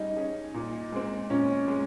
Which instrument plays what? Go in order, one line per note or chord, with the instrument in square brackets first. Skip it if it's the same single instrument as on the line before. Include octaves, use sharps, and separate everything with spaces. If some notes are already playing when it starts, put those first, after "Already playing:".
Already playing: [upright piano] G3 C#4 G#4 [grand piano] D#4
[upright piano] C#4 G#4
A#2
G#3 C4
[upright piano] A#2 [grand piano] C#4
[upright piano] G#3